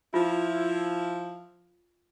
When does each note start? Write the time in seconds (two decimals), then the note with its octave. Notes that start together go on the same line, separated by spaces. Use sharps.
0.14 F3 E4 F4